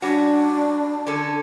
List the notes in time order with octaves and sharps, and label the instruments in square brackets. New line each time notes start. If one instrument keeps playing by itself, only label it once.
[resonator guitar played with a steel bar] G3 C#4 F#4 [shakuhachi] D4
[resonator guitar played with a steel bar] D3 C#4 A4